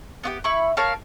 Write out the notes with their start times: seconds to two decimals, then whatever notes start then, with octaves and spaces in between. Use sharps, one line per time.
0.24 B3 F4 G4
0.44 E4 B5 C#6
0.77 A#4 C#5 F5 A5